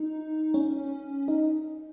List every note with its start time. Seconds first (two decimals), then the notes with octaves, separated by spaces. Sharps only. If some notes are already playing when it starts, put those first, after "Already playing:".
Already playing: D#4
0.54 C#4
1.28 D#4